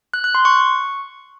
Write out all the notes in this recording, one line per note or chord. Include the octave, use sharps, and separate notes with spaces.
F#6
F#6
C6
C#6